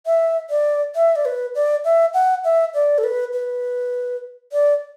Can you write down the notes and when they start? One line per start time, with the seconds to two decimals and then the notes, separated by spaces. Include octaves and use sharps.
0.06 E5
0.50 D5
0.95 E5
1.16 D5
1.25 B4
1.55 D5
1.85 E5
2.14 F#5
2.44 E5
2.74 D5
2.98 A4
3.04 B4
3.33 B4
4.52 D5